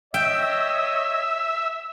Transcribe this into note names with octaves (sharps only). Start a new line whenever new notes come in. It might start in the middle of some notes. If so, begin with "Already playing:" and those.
C#5 D#5 E5 G5